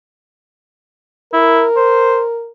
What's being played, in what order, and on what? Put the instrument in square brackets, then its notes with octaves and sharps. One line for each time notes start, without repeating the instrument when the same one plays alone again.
[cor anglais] E4 [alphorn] A#4
[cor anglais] C5